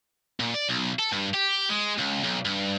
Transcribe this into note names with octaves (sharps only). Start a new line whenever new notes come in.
A#2
D5
B1
A4
G2
G4
G#3
C#2
B1
G2